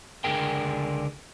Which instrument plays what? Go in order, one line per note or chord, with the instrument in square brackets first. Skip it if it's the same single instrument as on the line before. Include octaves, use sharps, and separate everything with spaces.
[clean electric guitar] C#2 D3 G#4 A#4 G5